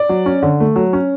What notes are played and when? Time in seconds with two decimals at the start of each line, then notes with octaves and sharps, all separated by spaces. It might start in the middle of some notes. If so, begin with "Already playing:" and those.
Already playing: D5
0.09 F#3
0.26 C#4
0.43 D3
0.60 A3
0.76 F#3
0.93 C#4